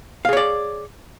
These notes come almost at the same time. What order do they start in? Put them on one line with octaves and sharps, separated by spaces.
F5 G#4 C#5 D5